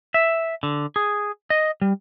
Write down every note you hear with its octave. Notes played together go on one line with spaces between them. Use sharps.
E5
D3
G#4
D#5
G3